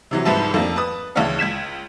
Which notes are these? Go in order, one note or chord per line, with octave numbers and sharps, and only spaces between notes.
C3 E3 F#3
C2 G#2 F3 B4 E5 A5
F2 A3 A#3 D4
B4 A5 D#6
D2 C#3 E3 C#4 C#5 F5
C#2 G#6 B6 E7